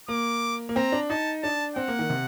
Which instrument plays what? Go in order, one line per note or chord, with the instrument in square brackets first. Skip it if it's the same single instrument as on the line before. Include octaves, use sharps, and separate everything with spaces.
[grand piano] A#3 [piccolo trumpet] D6
[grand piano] A#3
[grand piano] C4 [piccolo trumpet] A#5
[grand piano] D4
[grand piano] D#4 [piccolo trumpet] A5
[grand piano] D4 [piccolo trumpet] A5
[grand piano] C4 [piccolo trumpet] F#5
[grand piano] A#3
D#3
C3